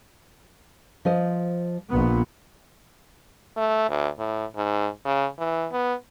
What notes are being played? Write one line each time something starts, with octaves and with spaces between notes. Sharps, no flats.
F3 C5 D#5
A#1 B3
A3
D2
A2
G#2
C#3
E3
B3